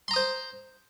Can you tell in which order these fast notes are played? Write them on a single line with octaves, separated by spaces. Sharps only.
C6 A#5 D#6 C5